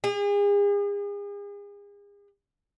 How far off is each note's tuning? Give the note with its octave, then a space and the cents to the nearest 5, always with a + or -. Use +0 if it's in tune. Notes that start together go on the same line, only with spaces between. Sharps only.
G#4 -40